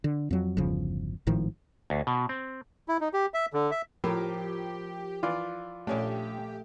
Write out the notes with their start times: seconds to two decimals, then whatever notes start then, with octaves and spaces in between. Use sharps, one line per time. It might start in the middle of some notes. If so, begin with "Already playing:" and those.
0.04 D3
0.31 F2 F#3
0.57 G1 E2 C#3 F3
1.27 G#1 A2 D#3 F3
1.90 D2
2.07 B2
2.29 C4
2.88 E4
3.01 D#4
3.14 G4
3.34 E5
3.53 D3
3.71 E5
4.04 A2 F3 G4 A#4
5.23 E3 F4 D5
5.87 A#1 A3 C#4 D4 G4